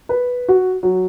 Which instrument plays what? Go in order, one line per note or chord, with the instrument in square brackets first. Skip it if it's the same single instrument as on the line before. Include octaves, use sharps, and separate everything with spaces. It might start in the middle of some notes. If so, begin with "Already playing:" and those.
[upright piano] B4
F#4
F#3